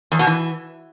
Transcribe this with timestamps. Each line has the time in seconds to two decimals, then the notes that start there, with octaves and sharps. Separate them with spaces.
0.12 E2
0.19 B2
0.27 E3